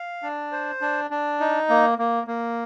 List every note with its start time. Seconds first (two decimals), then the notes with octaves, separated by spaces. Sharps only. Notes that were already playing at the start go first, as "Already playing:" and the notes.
Already playing: F5
0.23 D4
0.52 C5
0.81 D4
1.10 D4
1.40 D#4
1.69 A#3
1.98 A#3
2.27 A#3